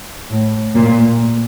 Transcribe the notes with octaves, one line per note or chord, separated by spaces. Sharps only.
A2
A#2